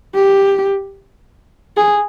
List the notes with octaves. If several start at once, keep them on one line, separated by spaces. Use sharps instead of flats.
G4
G#4